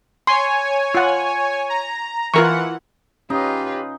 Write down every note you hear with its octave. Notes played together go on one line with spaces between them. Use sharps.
C#5 G#5 C6
F4 F#5
A#5
E3 F4 A#4 F#5 C#6
C#4 D#4 F4 G4 B4